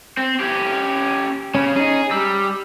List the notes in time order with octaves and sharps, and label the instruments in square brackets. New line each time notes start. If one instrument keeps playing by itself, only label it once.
[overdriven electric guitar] C4
C#4 G4
[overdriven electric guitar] C#3 [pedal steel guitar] C#4
[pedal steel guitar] C#4 D#4 [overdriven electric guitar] G#4
[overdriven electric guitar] G3 [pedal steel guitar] E6